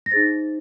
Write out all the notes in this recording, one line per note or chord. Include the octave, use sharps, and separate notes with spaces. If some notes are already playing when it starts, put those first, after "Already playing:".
A#6
D#4 G#4 C5 A6